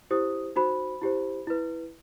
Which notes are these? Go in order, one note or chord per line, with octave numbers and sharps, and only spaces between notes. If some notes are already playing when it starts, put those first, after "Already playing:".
E4 G4 C5 D#6
D#4 F#4 C5 B5
E4 G4 C5
E4 B4